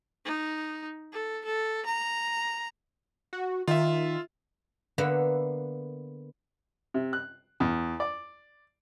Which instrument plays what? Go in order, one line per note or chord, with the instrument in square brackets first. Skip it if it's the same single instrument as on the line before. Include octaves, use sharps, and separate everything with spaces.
[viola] D#4
A4
A4
A#5
[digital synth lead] F#4
[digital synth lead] D#3 [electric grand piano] F4 E5
[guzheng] D3 A#3 B3 B4 E5
[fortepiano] C3
F#6
E2
D5